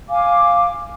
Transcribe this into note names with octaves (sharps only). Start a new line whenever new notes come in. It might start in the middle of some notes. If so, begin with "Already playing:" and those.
F5 G#5 D6